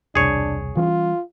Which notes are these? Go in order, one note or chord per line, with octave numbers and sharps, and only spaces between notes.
E1 C2 D4 G#4 C#5
E3 G3 C#4 F4